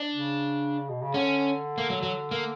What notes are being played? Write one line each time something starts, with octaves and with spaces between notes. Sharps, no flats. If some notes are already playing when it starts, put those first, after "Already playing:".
Already playing: D4
C#3
B2
C#3
D3 C#4
A#3
F#3
F#3
A#3